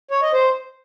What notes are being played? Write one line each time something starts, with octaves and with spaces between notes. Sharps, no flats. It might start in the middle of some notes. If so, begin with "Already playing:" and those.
C#5
D#5
C5